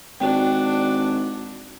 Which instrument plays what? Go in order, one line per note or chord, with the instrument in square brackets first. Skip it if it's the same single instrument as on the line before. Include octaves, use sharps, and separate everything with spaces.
[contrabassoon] G#1 [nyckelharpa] D4 F#4 [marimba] G5